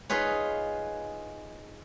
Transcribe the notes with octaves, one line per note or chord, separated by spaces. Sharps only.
D#4 F4 G#4 B4 C#5